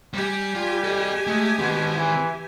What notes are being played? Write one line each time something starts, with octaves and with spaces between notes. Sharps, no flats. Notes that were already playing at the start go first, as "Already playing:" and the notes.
G3 G4 G#5
G3 F4
A4 D#5
G#3 A3
B2 D#3 C4
E3